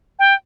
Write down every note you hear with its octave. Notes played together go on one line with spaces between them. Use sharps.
G5